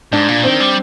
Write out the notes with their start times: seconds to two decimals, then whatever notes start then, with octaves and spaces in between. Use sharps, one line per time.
0.12 G#2 D4
0.28 A#2
0.43 D#3 C4
0.60 G3